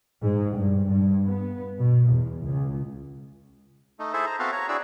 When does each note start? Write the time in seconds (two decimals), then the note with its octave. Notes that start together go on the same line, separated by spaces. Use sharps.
0.21 G#2
0.56 G2
0.86 G2
1.26 B3
1.79 B2
2.10 E2
2.44 C#2
3.99 A3 D#4
4.13 E4 G#4 A4 C5 E5
4.26 C5 A#5
4.39 B3 C4 F#4 A4 E5 F5
4.52 C#5 A#5
4.69 D4 E4 F#4 G#4 D5 E6